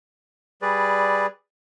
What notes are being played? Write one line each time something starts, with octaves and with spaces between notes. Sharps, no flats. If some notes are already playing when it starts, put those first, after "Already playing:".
G3 G#4 B4 D5